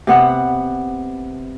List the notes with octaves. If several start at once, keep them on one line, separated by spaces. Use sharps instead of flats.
C3 B3 F#5